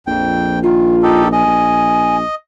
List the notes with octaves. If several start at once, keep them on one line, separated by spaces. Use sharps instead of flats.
A#1 F2 G5
D#3 F4
D#4 G4 A4
D#5 G#5
A#1